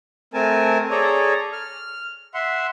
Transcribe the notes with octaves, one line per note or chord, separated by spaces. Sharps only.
A3 C4 A#4 G#5 A5
G#4 A4 C#5 D5 A#5
F6
E5 F#5 C6